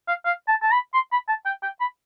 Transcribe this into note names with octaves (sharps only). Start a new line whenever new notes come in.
F5
F5
A5
A5
B5
C6
B5
A5
G5
G5
B5